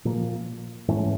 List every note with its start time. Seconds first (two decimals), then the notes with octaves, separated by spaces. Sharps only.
0.05 A#2 F3 A#3
0.88 G#2 E3 A3 C#4